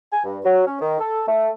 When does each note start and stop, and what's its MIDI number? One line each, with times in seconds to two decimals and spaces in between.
0.13 0.20 80
0.25 0.39 43
0.45 0.64 54
0.67 0.79 61
0.80 0.98 51
0.99 1.23 69
1.28 1.49 57